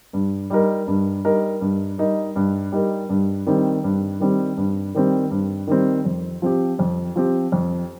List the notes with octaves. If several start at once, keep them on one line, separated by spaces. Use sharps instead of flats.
G2
G3 D#4 A#4
G2
G3 D#4 A#4
G2
G3 D#4 A#4
G2
G3 D#4 A#4
G2
D#3 G3 C4
G2
D#3 G3 C4
G2
D#3 G3 C4
G2
D#3 G3 C4
F2
F3 C4 G4
F2
F3 C4 G4
F2